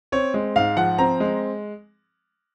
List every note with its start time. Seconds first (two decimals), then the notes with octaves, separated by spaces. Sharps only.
0.12 C4 C#5
0.34 G#3
0.56 G#2 F5
0.77 F3 F#5
0.98 C4 A#5
1.20 G#3